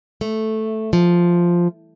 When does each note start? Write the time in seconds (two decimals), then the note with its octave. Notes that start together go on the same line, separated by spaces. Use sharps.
0.21 A3
0.93 F3